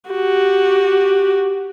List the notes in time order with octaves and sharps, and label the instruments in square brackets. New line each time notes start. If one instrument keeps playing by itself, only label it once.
[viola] F#4 G4